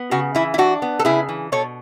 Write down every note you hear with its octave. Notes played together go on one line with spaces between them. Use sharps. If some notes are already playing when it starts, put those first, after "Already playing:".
Already playing: B3
C#3 F#4
E3 E4
E4
D4 F#4
B3
A4
C#3 E4 G#4
E3
B2 A4 C#5